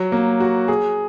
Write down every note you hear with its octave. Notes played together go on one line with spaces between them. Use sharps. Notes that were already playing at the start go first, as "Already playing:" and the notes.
Already playing: F#3
A#3
F#4
G#4